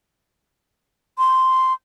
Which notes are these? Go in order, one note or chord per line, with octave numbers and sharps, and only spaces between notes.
C6